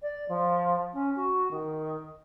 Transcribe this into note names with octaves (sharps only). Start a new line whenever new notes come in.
D5
F3
C#4
F#4
D#3